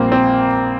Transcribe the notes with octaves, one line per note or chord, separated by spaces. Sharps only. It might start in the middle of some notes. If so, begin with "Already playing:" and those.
Already playing: A#1 A#2 G3 A#3 C4
C4